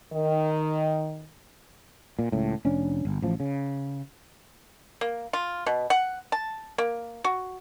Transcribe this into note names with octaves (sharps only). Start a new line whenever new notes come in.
D#3
A#2
C#2 A2
F1 C#4 D4
G1
A1 F3
C#3
A#3
F4
B2
F#5
A5
A#3
F#4